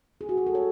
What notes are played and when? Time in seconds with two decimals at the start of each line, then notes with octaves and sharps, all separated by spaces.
0.21 G#4
0.29 F#4
0.37 G#4
0.47 A4
0.55 C#5